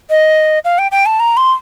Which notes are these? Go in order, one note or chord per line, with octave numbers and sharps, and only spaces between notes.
D#5
F5
G5
G5
A5
A#5
C6